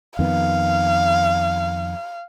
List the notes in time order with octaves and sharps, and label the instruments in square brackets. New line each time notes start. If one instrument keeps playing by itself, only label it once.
[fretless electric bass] F2 D#3 B3 [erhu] F5